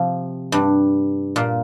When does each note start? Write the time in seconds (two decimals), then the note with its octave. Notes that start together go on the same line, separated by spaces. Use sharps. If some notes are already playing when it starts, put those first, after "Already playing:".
Already playing: C3 F3
0.52 G2
1.36 A#2